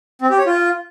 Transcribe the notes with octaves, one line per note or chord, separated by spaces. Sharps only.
C4
G4
C#5
F4